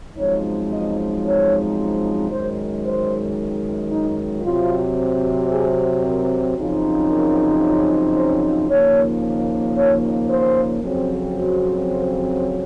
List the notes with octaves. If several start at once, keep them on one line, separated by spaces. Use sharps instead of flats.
F#2 F3 G#3 C4 D#4 C#5
D#5
C#5
F#2 D#3 G#3 C5
C5
D#4
C3 F#3 C4 F4
G#4
A#4
F#2 C#3 F3 C4 D#4
A#4
C5
D#2 C#3 F3 A#3 D#4 C#5
C#5
C5
F2 C#3 F#3 C4
F#4